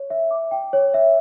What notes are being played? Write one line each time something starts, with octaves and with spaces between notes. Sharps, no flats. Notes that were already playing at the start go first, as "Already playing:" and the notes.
Already playing: C#5
E5
D6
G5
C#5
E5